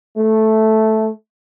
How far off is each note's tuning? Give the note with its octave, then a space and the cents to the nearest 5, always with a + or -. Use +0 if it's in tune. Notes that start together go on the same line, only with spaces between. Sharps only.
A3 -5